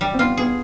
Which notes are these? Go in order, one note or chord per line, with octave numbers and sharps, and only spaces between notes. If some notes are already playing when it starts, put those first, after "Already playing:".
G3
C4
B3 F4
B3 G#4